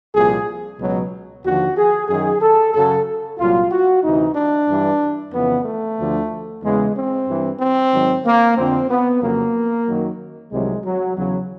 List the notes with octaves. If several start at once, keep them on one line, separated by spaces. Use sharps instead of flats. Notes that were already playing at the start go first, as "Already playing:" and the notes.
C2 A#2 F3 G#4
C#2 B2 F#3
D#2 D3 F3 F#4
G#4
F#2 D#3 F#3 G#4
A4
F#2 C#3 F#3 A4
C2 A#2 F#3 F4
F#4
D2 C3 E3 D#4
D4
G2 E3
F2 C#3 E3 B3
A3
D2 D3 F3
E2 C#3 E3 G#3
C4
G2 E3
C4
G#2 D#3 F#3
A#3
F2 D3 F3 C4
B3
F2 C#3 F#3 A#3
F#2 D#3 F#3
C2 C3 D#3 F#3 G#3
F#3
E2 C#3 F#3